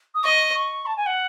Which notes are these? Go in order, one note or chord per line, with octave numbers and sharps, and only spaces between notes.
D#6
D#5 C#6
C#6
A5
G#5
F#5